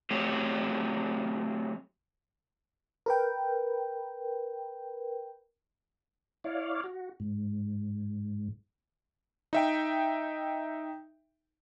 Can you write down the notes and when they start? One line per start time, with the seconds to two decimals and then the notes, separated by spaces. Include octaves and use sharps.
0.11 F#3 A3 C4 G4 G#4 C#5
3.06 A#4 B4 G5
6.44 E4 C#5 D5 F5
6.84 F#4
7.20 G#2
9.53 D#4 E5 G5